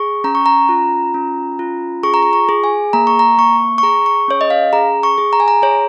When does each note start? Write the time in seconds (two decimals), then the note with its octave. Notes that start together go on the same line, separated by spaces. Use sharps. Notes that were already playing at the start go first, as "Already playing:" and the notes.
Already playing: G#4 C#6
0.24 C#4 A#5
0.35 C#6
0.46 A#5
0.69 F4
1.14 C#4
1.59 F4
2.03 G#4 C#6
2.14 A#5
2.23 C#6
2.33 C#6
2.49 G#4
2.64 G#5
2.93 A#3 A#5
3.07 C#6
3.19 A#5
3.38 A#3 C#6
3.78 C#6
3.83 G#4 A#5
4.06 C#6
4.28 C#4 C#5
4.41 D#5
4.50 F5
4.73 G#4 A#5
5.03 C#6
5.18 G#4
5.33 A#5
5.40 G#5
5.48 A#5
5.62 G#4 C#5